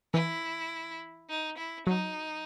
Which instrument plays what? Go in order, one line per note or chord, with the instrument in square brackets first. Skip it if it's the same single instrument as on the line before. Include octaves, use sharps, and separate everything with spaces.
[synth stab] E3 [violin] E4
[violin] D#4
E4
[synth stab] F#3 [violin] D#4